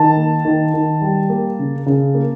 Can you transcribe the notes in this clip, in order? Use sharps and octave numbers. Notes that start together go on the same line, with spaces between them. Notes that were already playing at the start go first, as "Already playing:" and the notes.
Already playing: D#3 A5
A#3
D#3
D#3
G3
A#3
C#3
C#3
A#3